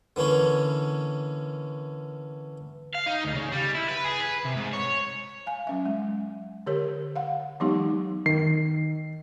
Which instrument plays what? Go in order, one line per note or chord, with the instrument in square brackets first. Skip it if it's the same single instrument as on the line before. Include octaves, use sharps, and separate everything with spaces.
[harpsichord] D3 E3 A#3 C#4
[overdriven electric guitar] F5
D#4
D2
C#3
G3
E4
B4
G#4
B4
C3
G#2
C#5
[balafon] F5 G#5
F#3 C#4 E5
G#3
D3 G4 A#4 C#5
F5 F#5
E3 F#3 G#3 B3 D#4 G4
[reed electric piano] D#3 [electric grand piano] C7